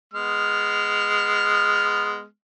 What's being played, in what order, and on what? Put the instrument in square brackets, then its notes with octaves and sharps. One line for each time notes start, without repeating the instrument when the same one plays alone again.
[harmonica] G#3 B3 F6